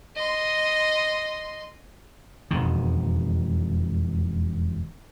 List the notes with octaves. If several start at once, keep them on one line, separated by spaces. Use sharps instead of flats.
D#5 C6
E1 F2 D#3